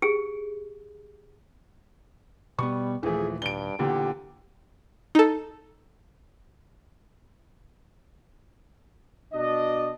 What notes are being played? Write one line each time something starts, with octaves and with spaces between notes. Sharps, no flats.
G4 G#4
B2 G3 B3 C#6
D#1 E3 F3 A3 G#4
G2 D7 G7
E2 A#2 D3 G4
D#4 A4
B2 D4 D#5